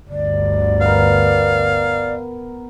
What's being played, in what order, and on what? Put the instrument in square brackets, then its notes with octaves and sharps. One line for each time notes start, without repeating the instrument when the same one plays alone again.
[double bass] G1 D2 [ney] D5
[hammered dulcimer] B3 A#4 [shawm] F5